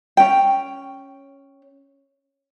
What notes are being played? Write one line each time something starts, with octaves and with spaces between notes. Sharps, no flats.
C#4 G5